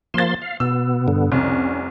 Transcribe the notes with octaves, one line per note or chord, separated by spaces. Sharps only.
F3 A#3 C6 A6 E7
F5
B2 B3 E6
G2 D3 B3
F1 C2 C#4